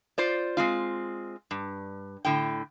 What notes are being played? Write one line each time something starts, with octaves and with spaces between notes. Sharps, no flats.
F4 C5 D5
G#3 C4 F4
G2
A2 D3 G5